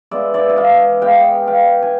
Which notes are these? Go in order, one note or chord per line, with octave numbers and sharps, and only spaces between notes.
G#3 B3 D5 E5
D5 E5
E5
E3 D#5 F5
G#3 B3 F5 G5
E3 F5 G5
G#5